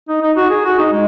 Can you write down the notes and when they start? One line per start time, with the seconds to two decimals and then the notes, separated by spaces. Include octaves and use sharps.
0.09 D#4
0.22 D#4
0.36 F#4
0.51 G#4
0.65 F#4
0.79 D#4
0.92 G#3